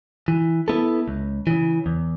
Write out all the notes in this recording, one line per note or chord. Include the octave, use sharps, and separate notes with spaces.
E3
B3 E4 A4
C#2
C#3 E3
E2